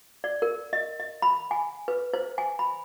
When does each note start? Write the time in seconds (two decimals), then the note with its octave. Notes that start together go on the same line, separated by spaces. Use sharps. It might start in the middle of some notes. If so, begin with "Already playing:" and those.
0.24 D5
0.42 A#4
0.73 D#5
1.00 D#5
1.22 B5
1.51 G#5
1.88 B4
2.14 C5
2.38 G#5
2.59 B5